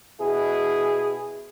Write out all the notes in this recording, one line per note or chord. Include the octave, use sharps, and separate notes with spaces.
B2 E4 G#4